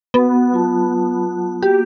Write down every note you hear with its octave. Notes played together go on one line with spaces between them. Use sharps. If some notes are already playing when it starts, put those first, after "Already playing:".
B3 F#4 F#5
F#3 F4 A5
A#3 F#4 G4